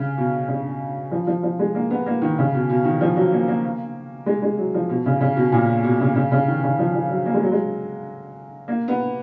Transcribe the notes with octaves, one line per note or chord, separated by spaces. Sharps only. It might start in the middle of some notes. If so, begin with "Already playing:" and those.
Already playing: C#3
B2
C#3
F3
F3
F3
G#3
A#3
B3
A#3
D#3
C#3
B2
B2
D#3
F3
F#3
A#3
A#3
G#3
G#3
F#3
F3
B2
C#3
C#3
B2
A#2
B2
C#3
C#3
C#3
D#3
C#3
F3
F3
F#3
A#3
G#3
F#3
G#3
A#3
B3